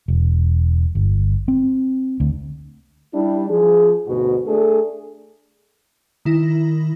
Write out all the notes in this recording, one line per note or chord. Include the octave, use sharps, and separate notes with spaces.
E1
G1
C4
D2
G3 D4 E4
F3 G#4
D2 G#2 B2 F#4
A3 D4 G#4 A4
D#3 E4 A#6